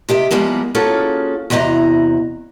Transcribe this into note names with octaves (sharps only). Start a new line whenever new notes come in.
C3 G4 D#5 E5
F3 G3 G#3 A#3 B3
A#3 C#4 F4 F#4 G#4 A4
E2 C3 F#4 D#5 A#5